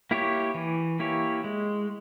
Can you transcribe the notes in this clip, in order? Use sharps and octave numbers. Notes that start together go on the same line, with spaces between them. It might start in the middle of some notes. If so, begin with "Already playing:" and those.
A#3 E4 G4 C#5
E3
A#3 E4 G4 C#5
G#3